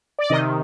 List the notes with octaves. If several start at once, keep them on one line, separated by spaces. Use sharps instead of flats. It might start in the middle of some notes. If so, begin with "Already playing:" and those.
D5
C3 D#3 D#5